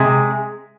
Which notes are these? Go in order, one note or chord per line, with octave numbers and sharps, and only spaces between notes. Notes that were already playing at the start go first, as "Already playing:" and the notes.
Already playing: C3 G#3